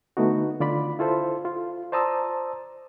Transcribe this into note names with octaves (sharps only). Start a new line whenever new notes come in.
D3 A3 B3 D#4 F#4
D3 F4 D5 B5
E4 F4 A4 C5
F4
C5 D5 A5 A#5 D#6 E6